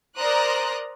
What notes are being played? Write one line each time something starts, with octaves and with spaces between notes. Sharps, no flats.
A#4 C5 D5 A#5 D#6 F#6